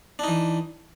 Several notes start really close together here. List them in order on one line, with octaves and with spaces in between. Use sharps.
D4 D#4 E3